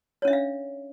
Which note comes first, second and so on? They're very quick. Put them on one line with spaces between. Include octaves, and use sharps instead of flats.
C#5 C#4 E5 D4 F5